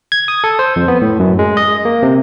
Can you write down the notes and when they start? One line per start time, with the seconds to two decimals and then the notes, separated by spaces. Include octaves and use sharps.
0.12 G#6
0.28 D#6
0.44 A4
0.59 C5
0.76 F2
0.88 B3
1.02 A2
1.19 F#2
1.39 G#3
1.57 D#5
1.85 A#3
2.03 C3